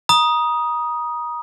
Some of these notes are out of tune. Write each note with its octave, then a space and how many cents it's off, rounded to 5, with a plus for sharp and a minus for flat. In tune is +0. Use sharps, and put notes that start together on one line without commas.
A#5 +35 D#6 +0